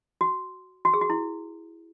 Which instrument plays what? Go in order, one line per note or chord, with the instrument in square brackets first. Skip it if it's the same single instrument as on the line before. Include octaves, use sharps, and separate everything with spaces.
[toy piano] F#4
F#4
G#4
F#4
E4